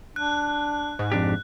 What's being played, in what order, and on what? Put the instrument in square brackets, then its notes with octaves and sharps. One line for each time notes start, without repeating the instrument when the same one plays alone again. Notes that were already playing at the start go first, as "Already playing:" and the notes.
[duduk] D4 [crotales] F#6
[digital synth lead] G#2
[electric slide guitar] F2 D4 G4